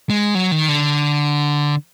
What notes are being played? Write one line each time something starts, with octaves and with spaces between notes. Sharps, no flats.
G#3
F#3
D#3
D3